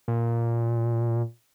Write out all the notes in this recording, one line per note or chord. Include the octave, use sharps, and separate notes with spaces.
A#2